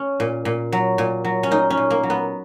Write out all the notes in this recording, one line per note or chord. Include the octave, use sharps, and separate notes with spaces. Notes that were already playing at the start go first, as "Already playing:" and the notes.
Already playing: C#4
A#2
A#2
F#3
A#2
F#3
C#4
A#2 D#4
C#4
A#2
A#3
F#3
B3